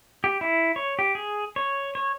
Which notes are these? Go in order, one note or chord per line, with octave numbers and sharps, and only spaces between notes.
G4
E4
C#5
G4
G#4
C#5
C#5